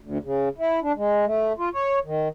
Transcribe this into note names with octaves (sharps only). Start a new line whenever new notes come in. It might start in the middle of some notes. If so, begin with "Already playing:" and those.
D2
C#3
E4
D4
G#3
A3
F4
C#5
D#3